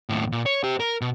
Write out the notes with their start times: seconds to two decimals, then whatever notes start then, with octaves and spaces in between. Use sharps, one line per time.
0.09 D#2 A2
0.32 A#2
0.46 C#5
0.64 G4 C5
0.80 A#4
1.01 B2